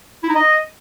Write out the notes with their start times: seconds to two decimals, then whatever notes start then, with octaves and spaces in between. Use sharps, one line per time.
0.23 E4
0.29 D#4
0.35 D#5